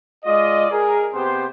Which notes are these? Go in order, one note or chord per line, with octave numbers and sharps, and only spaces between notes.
G#3 F4 D5 D#5
G#4 A#4
C3 B3 G4 C5